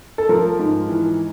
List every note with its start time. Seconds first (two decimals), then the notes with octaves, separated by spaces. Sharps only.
0.18 A4
0.29 F3 A#4
0.59 G#2
0.89 E3